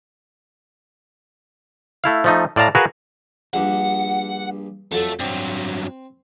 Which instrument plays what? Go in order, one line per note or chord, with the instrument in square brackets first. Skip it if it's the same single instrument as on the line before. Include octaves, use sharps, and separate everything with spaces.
[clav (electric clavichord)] A3 E4 F5
F3 A3 D#4
A2 D5 F5 A5 A#5
F#4 G#4 A#4 B4 F5
[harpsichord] A#1 G2 [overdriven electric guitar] F#5
[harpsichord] F2 F#3 A4 [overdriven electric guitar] A3
[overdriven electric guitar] G2 F#3 [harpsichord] C4